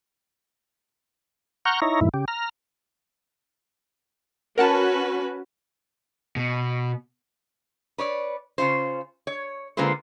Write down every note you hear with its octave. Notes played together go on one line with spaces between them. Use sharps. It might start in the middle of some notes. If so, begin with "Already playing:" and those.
F#5 A#5 C#6 F6 G6
D#4 E4 C#5 A#5
F#2 A2 D#3 E3 E4
C#3 G4
A#5 F6
C#4 F#4 A#4 B4 F#5 A5
B2
B4 C#5 D5
C#3 C#4 F4 C5
C#5
D3 G#3 A#3 F4 B4 C5